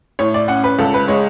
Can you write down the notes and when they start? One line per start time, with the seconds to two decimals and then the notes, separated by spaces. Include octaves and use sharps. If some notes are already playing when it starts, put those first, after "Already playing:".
0.19 A2 C#5
0.34 D5
0.48 C#4 F#5
0.64 B4
0.79 C#2 A4
0.94 B4
1.08 G#3 C#5